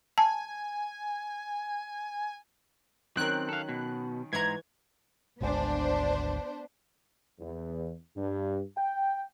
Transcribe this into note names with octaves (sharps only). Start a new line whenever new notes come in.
G#5 A5
D#3 F#3 C4 C#4 A#4 F#6
A4 F5
B2
G#2 E3 C#5 F#5 A#5 G#6
G#1 D2 G#3 B3 D4 C5
E2
G2
G5